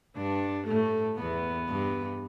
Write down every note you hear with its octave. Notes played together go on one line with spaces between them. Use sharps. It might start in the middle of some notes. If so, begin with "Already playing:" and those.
G2 D4
A2 A3
E2 B3
G2